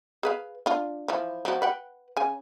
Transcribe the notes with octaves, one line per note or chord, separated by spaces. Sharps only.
G#4 B4 F5
D4 F4
E3 F3
F3 F#4
B4 F#5 G5
C#3 G#5